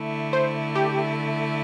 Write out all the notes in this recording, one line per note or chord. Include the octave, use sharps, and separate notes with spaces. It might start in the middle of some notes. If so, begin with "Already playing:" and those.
Already playing: D3 A3 E4
C5
G4